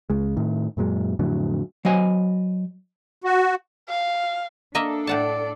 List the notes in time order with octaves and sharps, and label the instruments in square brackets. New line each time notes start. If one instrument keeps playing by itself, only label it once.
[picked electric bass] C#2 G#3
A2 D#3
F#2 A#2 F#3 G#3
F2 A2 D3 F#3
[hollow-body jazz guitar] F#3 C5 D#5 G#5
[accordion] F#4
[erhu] F5
[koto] A#3 D#5 E5 [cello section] D4 A4
[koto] A2 F#5 A5 [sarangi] D5